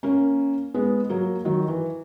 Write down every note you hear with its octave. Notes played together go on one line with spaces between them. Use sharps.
A#3 C#4
G#3 B3
F#3 A#3
D#3 F#3
E3